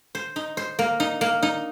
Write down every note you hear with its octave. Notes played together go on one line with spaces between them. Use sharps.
C5
D#4
C5
A#3
D#4
A#3
D#4